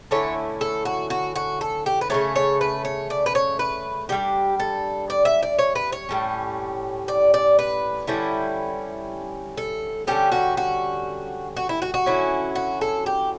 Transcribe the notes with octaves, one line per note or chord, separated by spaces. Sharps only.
D3 A3 C#4 E4 C#5
A4
F#4
F#4
F#4
A4
G4
B4
C#3 F#3 A3 C#5
C#5
B4
C#5
D5
B4
C#5
B4
D3 G3 D4 G4
A4
D5
E5
D5
C#5
B4
C#5
A2 G3 C#4
D5
D5
B4
D3 G3 C#4 E4
A4
D3 G3 C#4 G4
F#4
F#4
F#4
E4
F#4
F#4
D3 F#3 C#4 E4
F#4
A4
G4